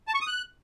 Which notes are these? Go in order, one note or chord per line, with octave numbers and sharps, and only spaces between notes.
A5
C#6
D#6
F#6